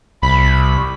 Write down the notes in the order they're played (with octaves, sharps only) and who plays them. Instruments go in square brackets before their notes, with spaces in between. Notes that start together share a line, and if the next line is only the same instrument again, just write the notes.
[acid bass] C2 [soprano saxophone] B5